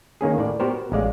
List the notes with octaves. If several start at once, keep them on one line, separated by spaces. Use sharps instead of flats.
D#3 A#3 C#4 G#4
A2 D5
B3 F#4 G4 A#4 C5
A1 G#3 D5 F5